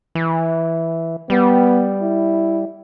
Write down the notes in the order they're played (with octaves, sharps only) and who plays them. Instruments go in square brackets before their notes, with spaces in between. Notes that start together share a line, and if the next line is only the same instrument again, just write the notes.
[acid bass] E3
[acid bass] G3 [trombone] B3
[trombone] E4